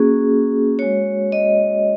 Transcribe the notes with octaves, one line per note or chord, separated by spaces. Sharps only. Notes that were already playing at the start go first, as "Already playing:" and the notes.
Already playing: A#3 C#4 F#4 G#4
G#3 F#4 C#5
D#5